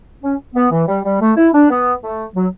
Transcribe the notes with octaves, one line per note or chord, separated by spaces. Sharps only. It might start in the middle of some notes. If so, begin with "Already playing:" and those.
C#4
B3
E3
G3
G3
A3
E4
D4
B3
A3
F#3